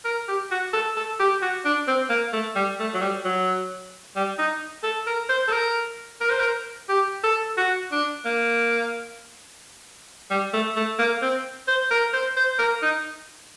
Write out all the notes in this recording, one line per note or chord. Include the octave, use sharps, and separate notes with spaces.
A#4
G4
F#4
A4
A4
G4
F#4
D4
C4
A#3
A3
G3
A3
F#3
G3
F#3
G3
D#4
A4
A#4
C5
A4
A#4
A#4
C5
A#4
G4
A4
F#4
D4
A#3
G3
A3
A3
A#3
C4
C5
A#4
C5
C5
A#4
D#4